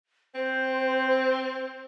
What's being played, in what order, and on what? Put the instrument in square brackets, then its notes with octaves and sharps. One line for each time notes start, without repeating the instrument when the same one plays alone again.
[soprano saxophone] C4 [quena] C5